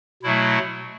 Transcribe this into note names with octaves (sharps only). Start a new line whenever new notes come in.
B2 F#3 A3 E4